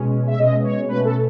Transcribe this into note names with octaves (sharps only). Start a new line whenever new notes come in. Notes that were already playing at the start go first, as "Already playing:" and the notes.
Already playing: B2 G#3 C#4
E5
B2 G#3 C#4 D#5
C#5
B2 A3 C#4 B4
A4